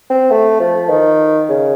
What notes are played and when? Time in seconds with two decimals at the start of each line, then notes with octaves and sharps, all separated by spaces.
0.10 C4
0.31 A3
0.60 F3
0.89 D#3
1.49 C#3